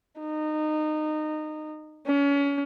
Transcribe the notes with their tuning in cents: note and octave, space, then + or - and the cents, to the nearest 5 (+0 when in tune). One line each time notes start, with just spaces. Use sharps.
D#4 -20
C#4 +30